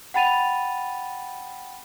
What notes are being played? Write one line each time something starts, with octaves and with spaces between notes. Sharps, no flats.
F#5 G5 B5 A6 D#7 F7